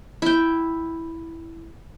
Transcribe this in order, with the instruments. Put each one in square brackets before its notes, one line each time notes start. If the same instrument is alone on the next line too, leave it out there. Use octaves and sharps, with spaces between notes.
[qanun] E4 G5